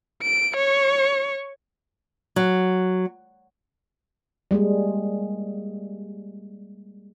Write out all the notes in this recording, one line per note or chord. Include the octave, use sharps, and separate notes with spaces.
D7
C#5 C#6
F#3
G3 G#3 A#3 G#4